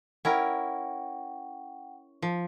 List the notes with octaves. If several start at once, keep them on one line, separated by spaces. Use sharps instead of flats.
C#4 E4 A#4 F#5 G5
F3